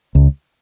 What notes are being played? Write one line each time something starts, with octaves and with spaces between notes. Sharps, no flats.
C#2